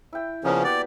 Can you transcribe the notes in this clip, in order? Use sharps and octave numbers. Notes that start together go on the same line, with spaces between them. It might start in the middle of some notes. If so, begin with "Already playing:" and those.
E4 G5
C#3 F3 A#3 B3 C#4 D5
F#4 G4 D5